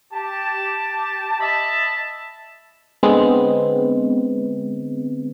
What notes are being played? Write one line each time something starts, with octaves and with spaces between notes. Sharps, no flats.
G4 A5
D#5 E5 A5 B5
D3 G#3 B3 C4